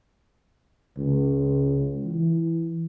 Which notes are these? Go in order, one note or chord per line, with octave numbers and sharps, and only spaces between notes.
C#2
E3